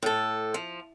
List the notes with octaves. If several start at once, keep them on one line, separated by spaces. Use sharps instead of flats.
A2 A4
F3